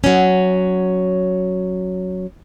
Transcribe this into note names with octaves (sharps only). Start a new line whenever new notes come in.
F#3 C#4